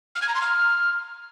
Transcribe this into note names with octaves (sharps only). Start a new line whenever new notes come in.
F6
G#6
A#5
C6
F6